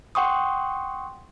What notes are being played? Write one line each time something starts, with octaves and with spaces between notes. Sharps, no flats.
F#5 G5 C6 C#6 D#6